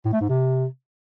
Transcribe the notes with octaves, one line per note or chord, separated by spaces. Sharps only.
A2
A3
G#2
C3